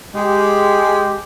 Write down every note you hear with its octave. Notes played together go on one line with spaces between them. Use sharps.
G#3 G4